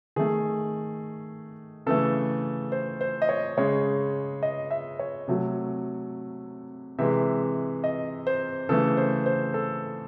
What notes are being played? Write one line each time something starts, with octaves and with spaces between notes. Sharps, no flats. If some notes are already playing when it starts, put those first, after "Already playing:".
D#3 A3 G#4
C#3 E3 A3 A4
C5
C5
D#5
C#5
C#3 G#3 C#5
D#5
E5
C#5
C3 F#3 A3
C3 E3 G#3 E5
D#5
C5
C#3 E3 A3 A4
C5
C5
A4